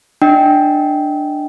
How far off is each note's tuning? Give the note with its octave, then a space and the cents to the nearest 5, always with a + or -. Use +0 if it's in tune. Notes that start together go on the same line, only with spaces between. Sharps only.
D4 +10 D#5 +30 G5 -10